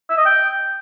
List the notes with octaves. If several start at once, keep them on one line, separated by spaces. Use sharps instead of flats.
E5
D#5
G5